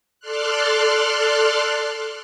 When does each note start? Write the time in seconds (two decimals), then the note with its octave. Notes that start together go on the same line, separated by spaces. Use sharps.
0.20 A4 D5 C6 F6 F#6